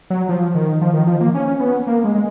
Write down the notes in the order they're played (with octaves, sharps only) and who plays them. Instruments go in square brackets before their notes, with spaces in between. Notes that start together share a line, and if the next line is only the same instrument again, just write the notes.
[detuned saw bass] F#3
F3
D#3
F3
D#3
F3
A#3
C#4
B3
A#3
G#3
G#3